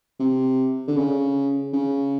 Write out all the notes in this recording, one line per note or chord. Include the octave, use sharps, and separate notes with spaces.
C3
D3
C#3
C#3